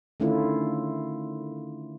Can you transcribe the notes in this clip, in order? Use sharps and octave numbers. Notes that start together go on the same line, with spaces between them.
D3 D#3 A3 C#4 E4 F4